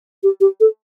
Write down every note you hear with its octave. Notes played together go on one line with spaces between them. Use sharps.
G4
G4
A4